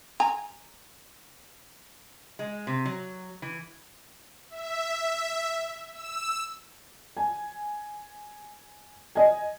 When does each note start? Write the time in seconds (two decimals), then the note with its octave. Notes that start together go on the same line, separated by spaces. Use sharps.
0.20 G#5 A#5
2.39 G#3
2.67 C3
2.85 F#3
3.42 E3
4.49 E5
5.92 E6
7.17 G#5
9.15 D#5 G#5